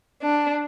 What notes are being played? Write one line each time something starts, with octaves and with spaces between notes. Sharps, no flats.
D4